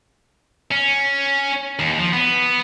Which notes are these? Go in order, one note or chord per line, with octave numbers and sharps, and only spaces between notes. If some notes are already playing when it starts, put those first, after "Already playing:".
C#4
D#2
F3
B3